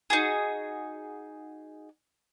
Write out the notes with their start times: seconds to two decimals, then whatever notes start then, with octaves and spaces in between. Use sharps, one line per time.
0.10 D#4 F#4 G#4